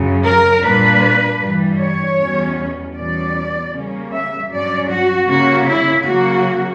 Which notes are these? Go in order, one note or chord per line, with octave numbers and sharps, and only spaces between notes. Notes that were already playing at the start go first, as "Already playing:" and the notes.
Already playing: F#2 C#3 F#3
A#4
A#2 G3 A#3 D4 B4
G2 E3 G3
C#5
E2 B2 G3 C#4
E2 B2 G3 C#4 D5
C#3 G3 A#3 C#4
E5
G2 F#3 C#4 D5
F#4
C#3 G3 A#3 C#4 F#4
E4
C#3 F#3 A#3 F#4